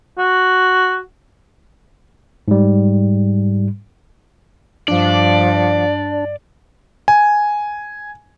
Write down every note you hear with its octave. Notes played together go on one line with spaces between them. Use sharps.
F#4
G#2 G3
G2 F3 D4 D5
G#5